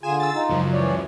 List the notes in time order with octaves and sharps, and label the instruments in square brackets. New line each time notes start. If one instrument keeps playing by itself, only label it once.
[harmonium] D3 F4 G#4 [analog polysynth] G#5 E7
[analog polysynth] E6 A6
[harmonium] D#4 F4
[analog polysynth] C#2 F#2 F3
[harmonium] E3 C#5 D5